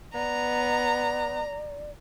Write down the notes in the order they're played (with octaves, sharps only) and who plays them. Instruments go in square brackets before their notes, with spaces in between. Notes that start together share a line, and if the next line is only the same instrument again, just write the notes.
[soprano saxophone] B3 [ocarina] D5 [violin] A#5